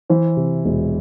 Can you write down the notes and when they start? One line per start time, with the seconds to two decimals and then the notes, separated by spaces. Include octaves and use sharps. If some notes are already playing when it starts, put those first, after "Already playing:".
0.10 E3 C5
0.37 C3
0.65 E1